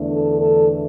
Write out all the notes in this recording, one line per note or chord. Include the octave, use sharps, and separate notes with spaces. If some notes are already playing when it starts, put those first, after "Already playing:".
Already playing: E2 D3 A3 D4
A4
A4